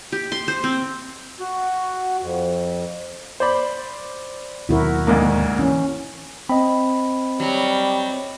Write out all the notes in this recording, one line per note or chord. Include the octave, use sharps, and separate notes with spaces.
G4
C6
C5
C4
F#4
F2
C5 D5 B5
D#2 B2 F#3 E4 F#4 A#4
D2 G#2 A#3
E3 C#4
C4 D#5 B5
F#3 G3